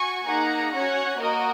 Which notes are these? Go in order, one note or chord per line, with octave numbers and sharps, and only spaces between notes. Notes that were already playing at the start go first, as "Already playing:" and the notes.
Already playing: F#4 G#5 C#6
A#3 D#4 G#4 F#5 A#5
C#4 F#4 C#5 F#5
A#3 F#4 A#4 D#5